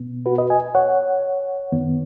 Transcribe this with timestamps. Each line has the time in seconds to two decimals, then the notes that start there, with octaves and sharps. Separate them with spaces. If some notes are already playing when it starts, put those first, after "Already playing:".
Already playing: B2 B3
0.26 F#4 B4
0.38 B4 D#5
0.50 D#5 G#5
0.75 C#5 F#5
1.72 F#2 D#3 B3